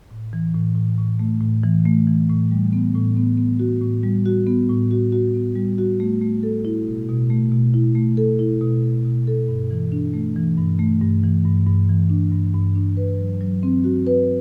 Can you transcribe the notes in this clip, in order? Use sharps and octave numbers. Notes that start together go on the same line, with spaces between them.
A2
E3
A2
A2
A2
A3
A2
E3
A3
E3
A2
G3
B3
A2
B3
B3
F#4
A2
G3
F#4
B3
A2
F#4
F#4
B3
G3
F#4
A3
A3
A4
E4
B2
B2
A3
B2
E4
A3
A4
E4
B2
A4
B2
A4
G2
E3
D4
A3
E3
G2
A3
G2
E3
G2
G2
E3
D4
G2
G2
D4
B4
F#3
F#3
C4
F#4
B4